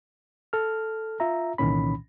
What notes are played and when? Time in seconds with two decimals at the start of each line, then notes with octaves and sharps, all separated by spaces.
0.53 A4 F6
1.20 F4 E5 A#5
1.58 C2 A#2 D#3 E3 C#4 B5